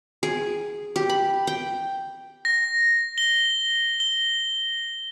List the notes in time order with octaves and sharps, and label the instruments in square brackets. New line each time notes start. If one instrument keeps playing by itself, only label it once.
[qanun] G#4
G4
B5
G5
[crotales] A#6
G7
G7